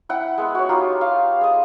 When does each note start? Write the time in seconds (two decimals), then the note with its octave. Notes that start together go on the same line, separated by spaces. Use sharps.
0.09 E4 F#5 G5
0.38 G#3 B3
0.55 F#4 C#5
0.69 D#4 F4 G4
1.01 F5
1.41 G#4 D#5